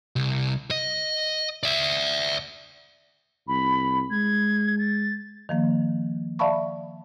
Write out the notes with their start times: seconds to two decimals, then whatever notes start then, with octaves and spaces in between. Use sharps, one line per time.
0.16 C2
0.71 D#5
1.63 D5 E5
3.48 C2 B5
4.11 G#3 G#6
4.78 A6
5.49 D#3 F3 A#3
6.39 D5 E5 F5 A5 B5 C#6